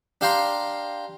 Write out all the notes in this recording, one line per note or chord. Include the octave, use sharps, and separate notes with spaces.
D4 G4 F5 G5 A#5 C6